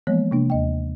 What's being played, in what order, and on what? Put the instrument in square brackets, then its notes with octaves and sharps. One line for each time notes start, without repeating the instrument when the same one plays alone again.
[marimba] E3 F3 G#3 A#3 B3 C#5
C3 A#3 D4
D#2 D#5 G5